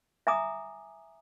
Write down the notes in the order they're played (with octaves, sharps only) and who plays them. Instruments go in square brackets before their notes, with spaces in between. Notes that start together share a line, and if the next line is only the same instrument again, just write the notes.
[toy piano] E5 G#5 A#5 D6 D#6